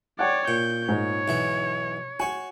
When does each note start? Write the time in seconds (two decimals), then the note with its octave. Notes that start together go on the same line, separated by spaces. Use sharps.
0.19 C#5 D5 F#5 G5
0.48 A#2 G6
0.88 G#2 C#5
1.28 B1 E3 E5
2.20 F#4 C#5 G#5